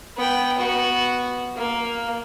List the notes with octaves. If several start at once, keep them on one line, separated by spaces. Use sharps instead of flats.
B3 G5
B3 F#4
A#3